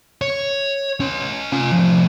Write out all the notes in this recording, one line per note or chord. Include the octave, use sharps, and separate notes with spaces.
C#5
C#4 C6
F4 G#5
A2 F3